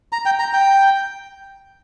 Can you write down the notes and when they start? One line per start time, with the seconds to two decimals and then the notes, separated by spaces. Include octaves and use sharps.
0.13 A#5
0.26 G5
0.39 A#5
0.53 G5